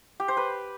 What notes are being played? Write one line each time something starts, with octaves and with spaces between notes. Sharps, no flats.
G4
C5
B4